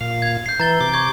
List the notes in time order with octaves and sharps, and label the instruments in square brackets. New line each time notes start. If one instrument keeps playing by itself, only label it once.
[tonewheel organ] A#2 F5
[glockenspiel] G#6
G6 C7
[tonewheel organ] E3 [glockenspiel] A#5 A6 G7
[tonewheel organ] C3 D6
[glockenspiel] C#6 G#6